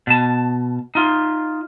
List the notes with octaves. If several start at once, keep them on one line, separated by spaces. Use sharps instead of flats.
B2 A5
D#4 F4